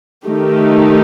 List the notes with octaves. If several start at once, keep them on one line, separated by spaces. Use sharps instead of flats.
D#3 A3 D#4 G4